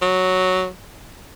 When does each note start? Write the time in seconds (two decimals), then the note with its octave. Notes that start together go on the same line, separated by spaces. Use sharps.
0.02 F#3